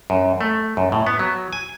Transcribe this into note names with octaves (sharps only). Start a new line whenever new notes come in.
F#2
A3
F#2
A2
B3
F#3
G#5